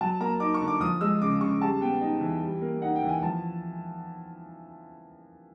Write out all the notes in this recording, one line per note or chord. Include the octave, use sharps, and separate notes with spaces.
F#3 A5
A#3 A#5
D#4 D6
C#6
D3
D6
F3 D#6
G#3 E6
C#3 D6
C#3 C#6
G3 A5
B3 G5
D#4
E3
G3
A#3
D#4 F#5
G5
E3
G#5
F3 A5